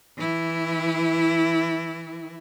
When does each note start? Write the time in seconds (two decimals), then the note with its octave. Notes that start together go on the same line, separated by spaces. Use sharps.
0.17 E3 E4